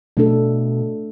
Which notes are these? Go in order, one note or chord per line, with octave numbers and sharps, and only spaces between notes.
B2 A3 D4 A4